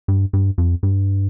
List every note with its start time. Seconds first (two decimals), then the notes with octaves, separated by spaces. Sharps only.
0.08 G2
0.33 G2
0.58 F2
0.83 G2